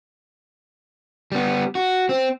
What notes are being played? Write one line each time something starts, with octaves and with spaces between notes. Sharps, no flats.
G3 B3
F#4
C4